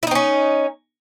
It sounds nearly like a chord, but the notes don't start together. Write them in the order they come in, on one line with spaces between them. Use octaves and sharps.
E4 D#4 C4 C#4